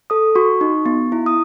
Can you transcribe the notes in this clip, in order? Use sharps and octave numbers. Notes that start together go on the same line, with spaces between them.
A4 D#6
F#4 C#6
D#4
B3
E4
D#6